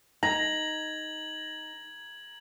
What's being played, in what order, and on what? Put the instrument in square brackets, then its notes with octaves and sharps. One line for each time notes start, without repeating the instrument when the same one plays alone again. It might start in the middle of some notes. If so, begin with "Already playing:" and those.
[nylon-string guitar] D#4 [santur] A#5 [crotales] G#6 F#7